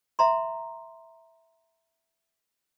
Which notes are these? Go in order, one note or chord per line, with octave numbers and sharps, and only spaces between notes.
E5 A#5 C6